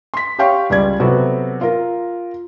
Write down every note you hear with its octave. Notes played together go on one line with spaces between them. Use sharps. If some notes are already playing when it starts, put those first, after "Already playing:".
C6 B6
G4 C#5 F5 G5 C6 C#6
C#2 G3 D5 G#6
C3 F#3 B3 F#4 A4
F4 A#4